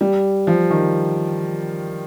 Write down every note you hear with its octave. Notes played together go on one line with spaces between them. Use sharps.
G3
F3
D#3